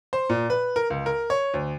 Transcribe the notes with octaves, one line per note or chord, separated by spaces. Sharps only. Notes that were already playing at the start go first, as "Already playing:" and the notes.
C5
A#2
B4
A#4
C#2
A#4
C#5
D2